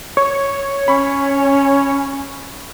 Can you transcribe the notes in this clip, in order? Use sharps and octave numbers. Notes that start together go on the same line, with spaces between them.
C#5 C#6
C#4 B5 C#6